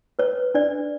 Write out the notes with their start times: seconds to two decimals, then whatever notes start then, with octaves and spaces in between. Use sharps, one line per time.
0.19 B4 C#5
0.54 D4 D5